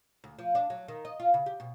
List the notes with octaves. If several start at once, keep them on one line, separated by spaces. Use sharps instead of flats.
D2
F3
D4
F#3
D#3
D#5
F4
C#3
G4
B2